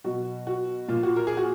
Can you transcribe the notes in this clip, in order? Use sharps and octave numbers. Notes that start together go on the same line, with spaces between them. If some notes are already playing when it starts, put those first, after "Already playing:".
B2 F#3 F#4
F#4
A#2 F3 F4
F#4
A#4
G#4
F#4